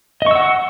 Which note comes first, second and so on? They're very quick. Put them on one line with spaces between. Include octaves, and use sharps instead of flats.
D#5 C#6 E6 F#5